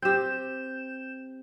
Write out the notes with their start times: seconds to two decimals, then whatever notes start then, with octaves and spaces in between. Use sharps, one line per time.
0.02 C4 G4 G6 E7